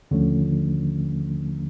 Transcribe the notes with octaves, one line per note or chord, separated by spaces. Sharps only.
D#2 D3 F3 A3 C#4